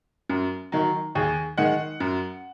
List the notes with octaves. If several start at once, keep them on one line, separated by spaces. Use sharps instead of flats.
F#2
D#3 F#3
D#2 G#4
D#3 G#3 F#5
F#2